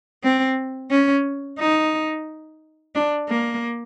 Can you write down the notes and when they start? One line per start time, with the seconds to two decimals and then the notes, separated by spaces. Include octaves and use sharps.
0.24 C4
0.91 C#4
1.59 D#4
2.95 D4
3.29 A#3